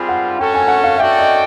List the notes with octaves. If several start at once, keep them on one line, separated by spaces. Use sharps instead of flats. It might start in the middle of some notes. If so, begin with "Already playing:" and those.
Already playing: G3 C4 F4 G#4 B5
F#5
C#4 F#4 A4 G5
G#5
F#5
F5
C#4 F#4 A4 D5 E5 G5
D#5